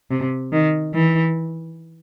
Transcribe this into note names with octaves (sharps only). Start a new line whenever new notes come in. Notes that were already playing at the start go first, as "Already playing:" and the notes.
C3
D#3
E3